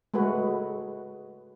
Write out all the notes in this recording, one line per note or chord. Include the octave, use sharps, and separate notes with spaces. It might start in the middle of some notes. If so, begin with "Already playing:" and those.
G#3 A3 F#4 B4